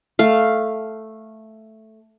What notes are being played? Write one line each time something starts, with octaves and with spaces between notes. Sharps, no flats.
A3 F5